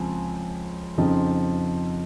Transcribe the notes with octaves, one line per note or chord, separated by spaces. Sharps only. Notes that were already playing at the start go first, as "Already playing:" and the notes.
Already playing: C#2 C#3 F3 C4 G#5
F2 C#3 F3 C4 D#4